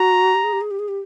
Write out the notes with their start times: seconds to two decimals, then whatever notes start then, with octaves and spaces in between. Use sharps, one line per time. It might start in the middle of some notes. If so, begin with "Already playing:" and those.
Already playing: F#4 A#5
0.35 G4
0.44 G#4
0.53 G4
0.61 G#4
0.71 G4
0.79 G#4
0.88 G4